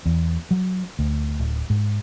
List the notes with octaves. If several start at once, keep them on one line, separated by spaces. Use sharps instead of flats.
E2
F#3
D2
D1
G#2